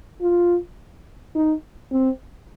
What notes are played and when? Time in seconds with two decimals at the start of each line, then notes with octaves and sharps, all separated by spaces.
0.21 F4
1.35 D#4
1.92 C4